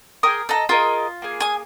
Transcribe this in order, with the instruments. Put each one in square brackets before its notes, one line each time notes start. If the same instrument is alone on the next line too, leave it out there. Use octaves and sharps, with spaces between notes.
[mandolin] G#4 G5 D#6 [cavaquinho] A#4
[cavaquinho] A4 A#5 [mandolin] D#5 F#5 A5
[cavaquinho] F4 [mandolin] G#4 A#4 D#5
[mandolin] A#3 G#4
[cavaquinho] G#5 D#6